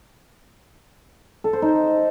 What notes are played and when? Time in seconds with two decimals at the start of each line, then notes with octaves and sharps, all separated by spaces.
1.44 A4
1.53 C5
1.62 D#4